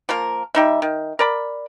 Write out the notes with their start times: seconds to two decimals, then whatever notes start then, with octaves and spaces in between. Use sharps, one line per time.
0.09 F3 A#3 A#4
0.55 G3 D#4 E5
0.82 D#3
1.19 A#4 D5 B5